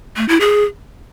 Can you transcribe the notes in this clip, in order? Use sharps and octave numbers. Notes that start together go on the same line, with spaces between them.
A3
E4
G#4